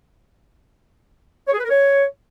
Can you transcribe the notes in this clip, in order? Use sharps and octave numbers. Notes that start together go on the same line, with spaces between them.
C#5
G#4
B4
A#4
C#5